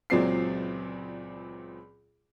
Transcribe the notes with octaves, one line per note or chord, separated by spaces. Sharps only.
C#2 A#2 F#3 C4 D5 C7